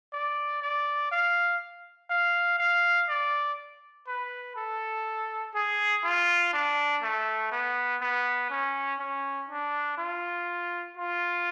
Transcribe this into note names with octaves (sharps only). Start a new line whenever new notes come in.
D5
D5
F5
F5
F5
D5
B4
A4
G#4
F4
D4
A3
B3
B3
C#4
C#4
D4
F4
F4